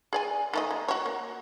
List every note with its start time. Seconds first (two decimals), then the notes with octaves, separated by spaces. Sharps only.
0.13 G#4 D5 G#5
0.53 D#3 A3 D#5
0.71 A#3
0.88 F#4 C#5
1.06 A#3